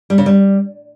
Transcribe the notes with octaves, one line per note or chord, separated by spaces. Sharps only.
G3
C#3
G3